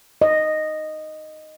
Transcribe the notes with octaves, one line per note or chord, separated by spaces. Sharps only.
D#5